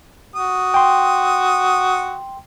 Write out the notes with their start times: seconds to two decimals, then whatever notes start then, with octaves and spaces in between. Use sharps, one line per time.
0.36 F#4 D#6
0.74 G5 C6